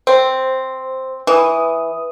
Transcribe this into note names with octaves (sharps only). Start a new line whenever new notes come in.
C4 C5
E3 B4 D#6